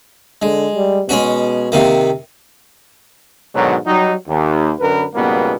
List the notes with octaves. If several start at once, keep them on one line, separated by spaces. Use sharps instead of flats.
D3 G#3
G3
B2 G#3 C#4 F#4
C3 D#3 A#3
G#2 B2 D3 D#3 F#3
F#3 G3 D#4
D#2
F#2 D3 A#4 B4
C#2 G#2 B2 G3 A#3 B3